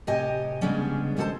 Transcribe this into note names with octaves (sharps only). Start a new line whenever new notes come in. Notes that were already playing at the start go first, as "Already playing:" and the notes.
A2 C3 G4 D#5 G#5
C#3 G3 G#3 B3 C#4 D4
D#2 G#3 G4 A4 C5 A5